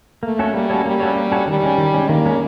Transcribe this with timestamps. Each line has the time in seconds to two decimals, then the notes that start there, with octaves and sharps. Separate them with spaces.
0.23 A3 A#3
0.39 C#4 F#4 A4 C#5
0.54 G3 A#3
0.70 C#4 F#4 A4 C#5
0.85 G3 A#3
1.00 C#4 F#4 A4 C#5
1.16 A#3
1.32 C#4 F#4 A4 C#5
1.47 D#3 G3
1.63 G#3 C#4
1.78 D#3
1.94 G#3 C#4
2.09 D#3 A#3
2.25 G#3 C#4